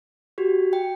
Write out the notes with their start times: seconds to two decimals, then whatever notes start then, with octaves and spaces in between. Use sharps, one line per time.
0.38 F#4 G4
0.73 G5